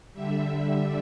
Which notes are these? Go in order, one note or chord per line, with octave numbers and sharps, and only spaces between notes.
D3 G3 E5